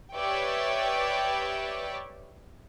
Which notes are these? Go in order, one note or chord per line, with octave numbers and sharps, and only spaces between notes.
G4 B4 C#5 D5 E5 G5